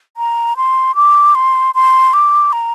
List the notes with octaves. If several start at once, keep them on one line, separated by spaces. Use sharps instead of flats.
A#5
C6
D6
C6
C6
D6
A#5